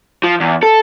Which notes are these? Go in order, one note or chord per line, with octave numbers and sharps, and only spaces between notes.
F3
E2
A4